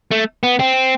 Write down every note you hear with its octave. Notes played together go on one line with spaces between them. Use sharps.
A3
B3
C4